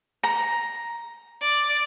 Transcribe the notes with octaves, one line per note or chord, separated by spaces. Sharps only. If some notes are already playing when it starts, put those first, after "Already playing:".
A#5
D5